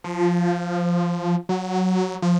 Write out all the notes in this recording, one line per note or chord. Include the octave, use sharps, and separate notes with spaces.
F3
F#3
F3